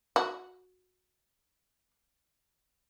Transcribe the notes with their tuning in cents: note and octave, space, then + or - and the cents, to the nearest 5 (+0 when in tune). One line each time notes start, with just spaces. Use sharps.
F#4 -15